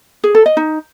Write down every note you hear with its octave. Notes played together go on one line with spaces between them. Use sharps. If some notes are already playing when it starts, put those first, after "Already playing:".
G#4
A4
D#5
D#4